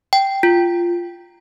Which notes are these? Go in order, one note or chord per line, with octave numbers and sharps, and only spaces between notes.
G5
F4